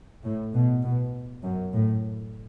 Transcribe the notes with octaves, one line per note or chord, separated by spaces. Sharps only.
A2
B2
B2
F#2
A2